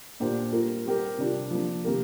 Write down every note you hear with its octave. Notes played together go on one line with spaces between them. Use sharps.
A#2 A#3 D4 G4 C5
G3 A#3 F4 A#4
G3 C4 G4 A#4
C3 G3 D4 F4
F3 A#3 D4
C3 A#3 G4 A#4